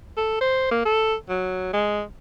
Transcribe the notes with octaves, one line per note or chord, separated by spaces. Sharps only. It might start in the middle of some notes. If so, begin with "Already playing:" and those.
A4
C5
A#3
A4
F#3
G#3